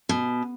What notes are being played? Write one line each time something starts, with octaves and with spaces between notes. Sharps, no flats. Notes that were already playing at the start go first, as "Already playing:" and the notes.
B2